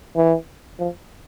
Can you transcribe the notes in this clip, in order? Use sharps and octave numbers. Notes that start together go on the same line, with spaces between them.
E3
F3